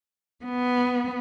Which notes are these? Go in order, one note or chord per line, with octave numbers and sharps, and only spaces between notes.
B3